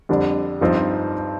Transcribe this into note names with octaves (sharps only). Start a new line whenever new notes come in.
F2 D3 G3 D4
G2 F3 C4 D#4